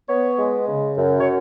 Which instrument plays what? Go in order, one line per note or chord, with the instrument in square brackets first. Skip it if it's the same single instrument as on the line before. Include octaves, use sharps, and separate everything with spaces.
[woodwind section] B3 C#5
G#3
C#3
F#2
C#5